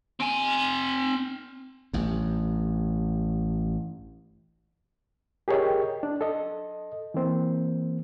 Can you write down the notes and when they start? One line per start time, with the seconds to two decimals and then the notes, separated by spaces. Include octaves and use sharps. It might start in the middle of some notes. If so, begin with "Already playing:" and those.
0.20 C4 G#5
1.93 A1 G2
5.48 G4 G#4 A#4 C#5 D#5 G5
6.03 D4
6.21 A4 D#5
7.14 E3 A#3 C4